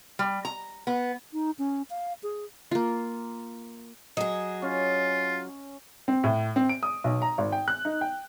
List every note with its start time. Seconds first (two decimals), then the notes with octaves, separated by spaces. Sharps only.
0.19 G3
0.45 A#5
0.87 B3
1.33 D#4
1.59 C#4
1.90 F5
2.23 G#4
2.71 A#3 F4
4.17 F#3 G#4 D#5
4.62 C#4 F4
6.08 C4
6.24 A2
6.56 C4
6.69 D7
6.83 D#6
7.04 B1
7.22 A#5
7.38 G#1
7.52 G5
7.68 F#6
7.85 D#4
8.01 G5